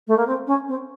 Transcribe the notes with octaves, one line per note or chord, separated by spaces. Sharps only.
A3
A#3
C4
C#4
C4